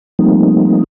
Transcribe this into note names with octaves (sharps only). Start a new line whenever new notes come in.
F3 G3 A3 A#3 C4 D#4